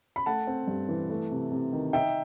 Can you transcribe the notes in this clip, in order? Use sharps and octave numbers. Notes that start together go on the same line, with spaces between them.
B5
A3 F#5 A5
C4
G2
E3
A3
C3
C3
D#3
D#4 E5 G5